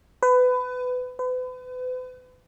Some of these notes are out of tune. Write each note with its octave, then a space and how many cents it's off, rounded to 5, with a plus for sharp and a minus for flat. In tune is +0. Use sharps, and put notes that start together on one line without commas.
B4 +25
B4 +40